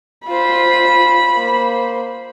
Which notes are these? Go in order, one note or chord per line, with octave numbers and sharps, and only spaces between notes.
F4 C5 B5
A#3 C5